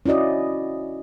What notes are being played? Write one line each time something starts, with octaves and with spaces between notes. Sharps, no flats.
C#4 E4 F#4 D5 D#5